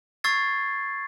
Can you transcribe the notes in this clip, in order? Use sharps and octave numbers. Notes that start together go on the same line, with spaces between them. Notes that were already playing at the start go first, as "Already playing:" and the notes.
C#6 E6 G#6 A6 C7